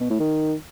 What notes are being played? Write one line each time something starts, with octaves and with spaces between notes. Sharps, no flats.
B2
A2
D#3